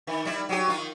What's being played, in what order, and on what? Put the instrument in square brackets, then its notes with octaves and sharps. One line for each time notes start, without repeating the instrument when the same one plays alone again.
[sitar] D#3
G3 E4
F#3 G4
D#3 F4